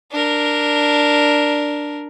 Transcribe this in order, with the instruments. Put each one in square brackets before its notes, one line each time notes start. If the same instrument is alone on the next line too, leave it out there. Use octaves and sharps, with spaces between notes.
[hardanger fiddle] D4 A#4